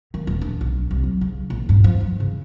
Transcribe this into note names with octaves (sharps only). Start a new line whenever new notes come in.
D#3
D#1
D4
B1
C2
F#3
C#3
A#1
G2
F3
G2
C#3